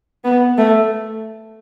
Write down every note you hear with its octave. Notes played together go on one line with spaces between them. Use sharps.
B3
A3